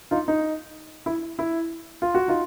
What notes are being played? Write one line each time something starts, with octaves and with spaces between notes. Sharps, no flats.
D#4 F4
D#4
E4
E4
F4
F#4
D#4 F4